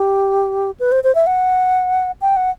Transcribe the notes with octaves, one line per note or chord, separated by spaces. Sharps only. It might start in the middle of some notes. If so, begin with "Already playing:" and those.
Already playing: G4
B4
C5
C5
E5
F#5
G5
F#5